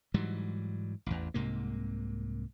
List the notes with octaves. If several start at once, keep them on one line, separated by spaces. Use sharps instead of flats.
G#2 E3 F#3 G3
A1 E2
C2 G#2 C3 A#3